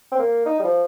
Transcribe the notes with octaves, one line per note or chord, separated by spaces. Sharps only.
C4
A#3
D#4
G3
F3